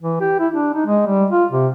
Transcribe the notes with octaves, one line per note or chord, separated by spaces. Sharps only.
E3
G4
E4
D4
D#4
G#3
G3
F4
C3